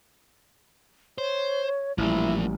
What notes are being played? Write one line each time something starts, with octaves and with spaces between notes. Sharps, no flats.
C5 C#5
A1 F3 G3 A#3 E4